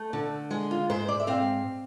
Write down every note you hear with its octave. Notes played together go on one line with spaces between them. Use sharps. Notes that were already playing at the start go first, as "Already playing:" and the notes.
Already playing: A3
D3
G#3 G#4
F4
G#2 C5
D5
E5
C4 F5